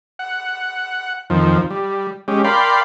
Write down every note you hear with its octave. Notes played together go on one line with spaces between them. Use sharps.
F#5
F2 D#3 F3
G3
G#3 C#4 G4
A#4 D5 F5 G5 B5 C6